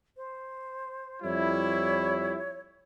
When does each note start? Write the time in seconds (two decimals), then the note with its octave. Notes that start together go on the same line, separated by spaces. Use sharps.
0.17 C5
1.23 F2 G3 E4 C#5